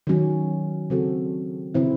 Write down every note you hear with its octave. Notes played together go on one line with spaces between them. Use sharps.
D#3 F#3 C#4
C#3 F#3 C4 F#4 A4
C#3 E3 C4 E4